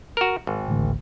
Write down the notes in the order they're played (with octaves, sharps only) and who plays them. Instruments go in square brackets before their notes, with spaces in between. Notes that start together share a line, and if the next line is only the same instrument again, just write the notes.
[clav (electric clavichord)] F#4 A#4
G#1
[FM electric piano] A1 D2